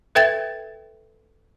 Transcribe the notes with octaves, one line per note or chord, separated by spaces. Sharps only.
A4 B4 E5 G5 G#6 A6